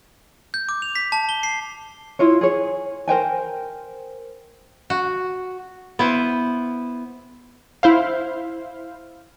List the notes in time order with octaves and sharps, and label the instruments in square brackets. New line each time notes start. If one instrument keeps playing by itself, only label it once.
[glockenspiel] G6
D6
F7
B6
A5
G7
C7
[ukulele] E4 F4 C#5
G#4 C#5
A#4 C5 G5 G#5
[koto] F#4
B3 E4 C5
[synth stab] E4 C5 F5